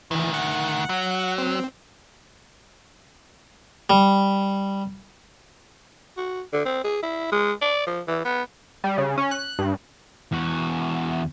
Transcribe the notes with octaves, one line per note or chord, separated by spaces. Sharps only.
D2 D#3 E3
F#5
F#3
C4
G3
F#4
D3
C4
G#4
E4
G#3
D5
F3
E3
B3
G3
C#3
C#4
F#6
G2
E2 F#4